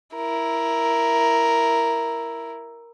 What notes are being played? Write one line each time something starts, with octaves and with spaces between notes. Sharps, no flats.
E4 A#4